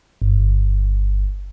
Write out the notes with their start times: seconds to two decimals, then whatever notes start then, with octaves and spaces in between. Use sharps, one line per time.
0.22 G1